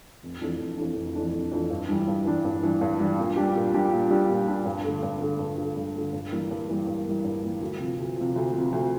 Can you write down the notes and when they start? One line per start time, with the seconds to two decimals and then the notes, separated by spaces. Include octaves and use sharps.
0.23 F1
0.41 F2 E3 A3 D4
0.60 F1
0.78 F2 E3 A3 D4
0.96 F1
1.15 F2 E3 A3 D4
1.34 F1
1.52 F2 E3 A3 D4
1.70 G2
1.88 E3 G3 D4
2.08 G2
2.25 E3 G3 D4
2.45 G2
2.63 E3 G3 D4
2.81 G2
2.99 E3 G3 D4
3.18 A#2
3.36 G3 D4 G4
3.55 A#2
3.74 G3 D4 G4
3.93 A#2
4.10 G3 D4 G4
4.29 A#2
4.48 G3 D4 G4
4.65 G2
4.84 D3 A3
5.03 G2
5.21 D3 A3
5.39 G2
5.58 D3 A3
5.77 G2
5.96 D3 A3
6.13 G2
6.32 E3 G3 A#3
6.51 G2
6.69 E3 G3 A#3
6.87 G2
7.06 E3 G3 A#3
7.24 G2
7.43 E3 G3 A#3
7.61 D2
7.79 C3 F3
7.99 D2
8.16 C3 F3
8.36 D2
8.53 C3 F3
8.72 D2